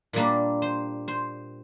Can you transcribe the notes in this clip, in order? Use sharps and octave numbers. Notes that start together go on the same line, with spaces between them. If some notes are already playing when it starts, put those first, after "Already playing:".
A#2 G3 A#3 D4
C5
C5